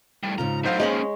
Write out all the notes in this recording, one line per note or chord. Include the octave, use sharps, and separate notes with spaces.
A2 G3
G#2 C#3 F4 A#5
A2 F#3 D#4 C5 F5
G#3 A#3 C#4 C#5 D#5 B5